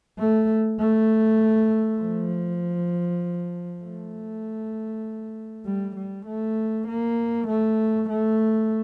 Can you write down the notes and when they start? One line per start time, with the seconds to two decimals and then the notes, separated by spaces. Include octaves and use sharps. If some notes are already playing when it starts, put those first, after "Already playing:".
0.19 A3
0.79 A3
2.01 F3
3.83 A3
5.66 G3
5.96 G3
6.26 A3
6.88 A#3
7.48 A3
8.10 A3